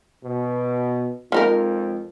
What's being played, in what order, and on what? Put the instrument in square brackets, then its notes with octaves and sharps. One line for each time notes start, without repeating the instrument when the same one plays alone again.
[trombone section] B2
[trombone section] F2 G#3 [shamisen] F3 D#4 A#4